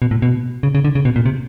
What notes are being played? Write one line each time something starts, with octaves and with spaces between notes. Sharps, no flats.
B2
A2
B2
C#3
C#3
D3
C#3
B2
A#2
C3